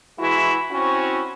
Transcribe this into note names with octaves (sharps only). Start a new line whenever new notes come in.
E3 G#3 E4 F#4
C4 C#4 E4 F#4